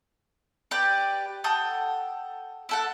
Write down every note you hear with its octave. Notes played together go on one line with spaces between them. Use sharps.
G4 B4 D5 G5
A4 F#5 G5 D#6
E4 A4 F#5